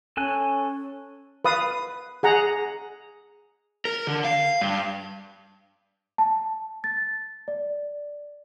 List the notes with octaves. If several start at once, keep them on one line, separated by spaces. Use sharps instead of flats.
C#4 A4 G#5 F#6
B4 F5 D#6
G#4 F#5 A#5
A#4
D3
F5
G2
A5
A6
A6
D5